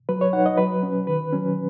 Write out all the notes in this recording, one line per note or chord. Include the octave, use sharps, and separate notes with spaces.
F#3 B4
C#5
D#4 F#5
D#5
F#3 B4
C#4
D#3 B4
F#3 C#4